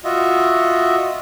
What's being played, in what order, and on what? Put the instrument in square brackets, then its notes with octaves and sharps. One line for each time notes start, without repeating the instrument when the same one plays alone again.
[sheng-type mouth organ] F4 F#4 D#5 E5